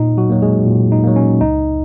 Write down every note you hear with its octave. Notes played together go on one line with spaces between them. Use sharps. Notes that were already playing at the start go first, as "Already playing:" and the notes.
Already playing: A#2 D#4
F#3 F#4
F#3 A#3
G#3 G#4
A#2
D#4
F#3 A#3
C#4
C#2 D#4